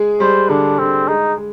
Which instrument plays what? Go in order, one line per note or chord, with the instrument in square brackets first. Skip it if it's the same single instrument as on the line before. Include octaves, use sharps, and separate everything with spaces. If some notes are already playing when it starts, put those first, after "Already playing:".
Already playing: [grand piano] G#3 G#4
[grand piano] G3 [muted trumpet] C5
[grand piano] D3 [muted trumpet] D4
[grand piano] D3 [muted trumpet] C4
[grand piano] G#3 [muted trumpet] D#4
[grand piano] G#3